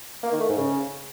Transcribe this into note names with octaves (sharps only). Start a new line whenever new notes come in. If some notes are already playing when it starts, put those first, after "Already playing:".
A#3
D#3
A3
G#2
C#3